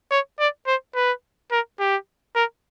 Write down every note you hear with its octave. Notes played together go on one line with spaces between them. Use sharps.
C#5
D5
C5
B4
A#4
G4
A#4